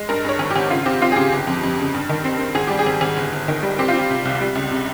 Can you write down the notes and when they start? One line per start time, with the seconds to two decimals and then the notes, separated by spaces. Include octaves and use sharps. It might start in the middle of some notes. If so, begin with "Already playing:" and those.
Already playing: G#3
0.09 G2 A#4
0.25 G2 C#5
0.39 G#1
0.50 G4
0.56 G#1
0.70 C#3 F4
0.86 C4 G4
1.01 C4 F4
1.12 G#4
1.16 C#3 G4
1.32 G1
1.47 F2
1.63 F2
1.79 C#3
1.94 G2
2.09 D#3
2.24 C4
2.39 C4
2.55 G#1 G#4
2.67 G3 G4
2.79 G#4
2.86 G#1
3.01 G#1
3.17 G1
3.32 G1
3.48 D#3
3.63 G3
3.79 C4 G4
3.88 F4
3.94 C4 G4
4.10 C3
4.25 C2
4.41 G3
4.55 C#2
4.72 C3